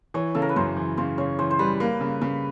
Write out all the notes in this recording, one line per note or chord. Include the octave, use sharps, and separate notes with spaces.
E3 C#5
C#3 A4
A#4
B4
F#2 C5
E3
C#3 C5
C#3 C#5
E3 C5
C5
G3 B4
A#3 B4
C#3
C#3 B4